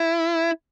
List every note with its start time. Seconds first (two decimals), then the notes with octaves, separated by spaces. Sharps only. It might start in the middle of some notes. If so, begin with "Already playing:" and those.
Already playing: E4